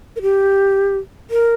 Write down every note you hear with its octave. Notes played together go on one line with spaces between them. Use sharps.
A#4
G4
A#4